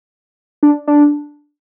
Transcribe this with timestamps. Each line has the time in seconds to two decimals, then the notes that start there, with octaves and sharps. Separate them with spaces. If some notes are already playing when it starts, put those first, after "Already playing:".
0.63 D4
0.88 D4